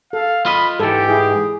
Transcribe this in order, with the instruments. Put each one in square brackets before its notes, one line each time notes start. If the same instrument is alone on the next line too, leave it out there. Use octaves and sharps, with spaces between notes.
[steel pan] A4 [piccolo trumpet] F5
[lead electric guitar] F4 D#5 [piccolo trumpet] B5
[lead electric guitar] G#2 E3 [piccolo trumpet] G4 [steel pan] A4
[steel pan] E4 [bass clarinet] G#4